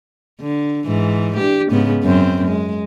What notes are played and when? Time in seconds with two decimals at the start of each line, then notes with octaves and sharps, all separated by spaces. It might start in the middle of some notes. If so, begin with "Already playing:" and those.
0.40 D3
0.86 G#2 E3
1.36 D4 G4
1.70 G#2 C#3 B3
2.03 F#2 C4
2.47 G#3